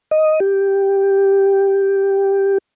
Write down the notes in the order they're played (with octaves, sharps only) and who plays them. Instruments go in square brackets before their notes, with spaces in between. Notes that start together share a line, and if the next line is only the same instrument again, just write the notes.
[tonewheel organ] D#5
G4